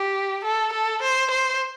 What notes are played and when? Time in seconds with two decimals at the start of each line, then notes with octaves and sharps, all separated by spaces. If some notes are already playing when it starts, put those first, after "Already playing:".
Already playing: G4
0.44 A4
0.72 A4
1.02 C5
1.31 C5